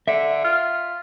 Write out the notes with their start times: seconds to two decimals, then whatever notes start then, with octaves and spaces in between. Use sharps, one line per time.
0.08 D3 E5
0.44 F4